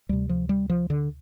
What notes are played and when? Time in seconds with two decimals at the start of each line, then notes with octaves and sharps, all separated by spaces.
0.09 D2 C3 G3
0.29 F3
0.49 G3
0.70 F3
0.90 D3